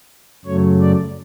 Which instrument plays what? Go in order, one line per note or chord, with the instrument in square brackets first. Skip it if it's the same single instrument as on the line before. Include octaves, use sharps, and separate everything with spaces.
[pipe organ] F#2 C#3 F#3 A3 C#5
D5